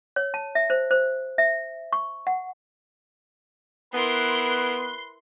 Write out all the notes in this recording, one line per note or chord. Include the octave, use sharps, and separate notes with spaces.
C#5
A5
E5
C5
C5
E5
C#6
F#5
B3 E4 A#4 B4 C6